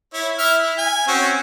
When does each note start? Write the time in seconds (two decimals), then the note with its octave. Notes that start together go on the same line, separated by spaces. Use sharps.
0.14 E4 C#5
0.38 E4 E5 F6
0.63 E4
0.78 G#5
1.08 C4 C#4 F#4